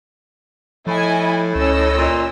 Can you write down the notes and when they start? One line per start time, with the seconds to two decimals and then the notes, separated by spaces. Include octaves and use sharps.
0.87 A2 F3 E4 D#5 G#5
1.55 C#2 C#4 D#5 E6
1.97 A#2